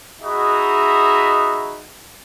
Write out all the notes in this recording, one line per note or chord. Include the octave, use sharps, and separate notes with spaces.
D#4 F#4 G#4 D#5 E5 B5